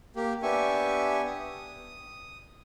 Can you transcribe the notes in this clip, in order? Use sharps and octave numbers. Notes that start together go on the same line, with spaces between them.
A#3 G4
B3 D4 G4 E5 G#5 C#6
D#6